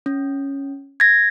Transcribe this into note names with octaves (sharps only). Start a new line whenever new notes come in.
C#4
G#6 A#6